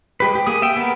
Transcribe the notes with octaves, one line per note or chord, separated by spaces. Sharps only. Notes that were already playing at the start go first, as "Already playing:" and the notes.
G#3 G4 B4
G4
A#3 G#4 D#6
E5 G5
B3 A#4